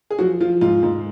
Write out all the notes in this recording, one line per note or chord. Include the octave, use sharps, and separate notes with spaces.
G#4
F3 F#3 F#4
F3 F4
G#2 F4
G#2